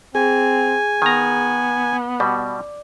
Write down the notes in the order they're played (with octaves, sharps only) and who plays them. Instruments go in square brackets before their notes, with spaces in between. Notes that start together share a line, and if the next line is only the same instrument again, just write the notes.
[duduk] C4 [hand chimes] G#4 [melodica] G#5
[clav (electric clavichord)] D#3 A#5 [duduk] B3
[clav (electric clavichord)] B2 G3 [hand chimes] D5